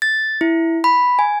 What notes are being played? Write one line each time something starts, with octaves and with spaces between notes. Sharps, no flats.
A6
E4
B5
G#5